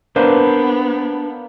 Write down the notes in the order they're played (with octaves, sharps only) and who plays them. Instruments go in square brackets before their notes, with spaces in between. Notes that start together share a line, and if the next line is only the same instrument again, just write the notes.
[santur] A#3 [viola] B3 [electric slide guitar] D4 B4 C5